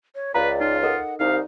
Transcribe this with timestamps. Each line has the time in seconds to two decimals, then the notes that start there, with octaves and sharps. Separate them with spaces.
0.15 C#5
0.34 C#2 B4 C#5 D5 F5 A#5
0.61 D#4 F4
0.83 A4 A#4 D#5 F#5
1.20 C2 D#4 F5